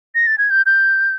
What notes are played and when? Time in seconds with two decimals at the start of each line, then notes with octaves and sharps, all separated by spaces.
0.15 A#6
0.27 A6
0.38 G#6
0.50 G6
0.66 G6